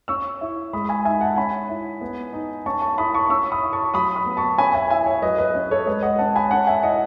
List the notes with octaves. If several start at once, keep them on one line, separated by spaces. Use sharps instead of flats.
C#4 C#6 E6
E4
G#3 B5 D#6
G#5 B5
D#4 E5 G#5
F#5 A5
C#4 G#5 B5
E4
B3
D#4
C#4 A5 C#6
A5 C#6
E4 B5 D#6
A5 C#6
C#4 C#6 E6
B5 D#6
E4
A5 C#6
F#3 B5 D#6
B5 D#6
B3
A5 C#6
C#4 G#5 B5
E5 G#5
E4 E5 G#5
C#5 E5
F#3 B4 D#5
B4 D#5
C#4
A4 C#5
G#3 B4 D#5
D#5 F#5
C#4 F#5 A5
G#5 B5
C#4 F#5 A5
E5 G#5
E4 D#5 F#5